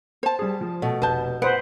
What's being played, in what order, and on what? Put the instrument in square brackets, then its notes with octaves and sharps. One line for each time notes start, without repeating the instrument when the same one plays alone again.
[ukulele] C5 A5
[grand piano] G3 G#4
F3
[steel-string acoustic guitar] B2 [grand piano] A3
[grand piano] F1 G6 [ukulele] B4 A5
[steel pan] B4 C5 [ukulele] F#5 [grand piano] D7